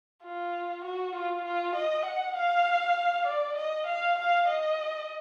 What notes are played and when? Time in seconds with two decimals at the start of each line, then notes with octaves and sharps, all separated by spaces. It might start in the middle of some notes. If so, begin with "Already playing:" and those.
0.24 F4
0.85 F#4
1.15 F4
1.45 F4
1.76 D#5
2.06 F#5
2.36 F5
3.27 D5
3.57 D#5
3.87 F5
4.18 F5
4.48 D#5